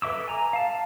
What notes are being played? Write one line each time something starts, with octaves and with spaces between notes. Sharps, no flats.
A4 B4 E5 D6 E6
G#5 A#5
F5 A5